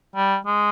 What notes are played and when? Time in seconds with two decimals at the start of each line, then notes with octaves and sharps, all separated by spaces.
0.16 G3
0.46 G#3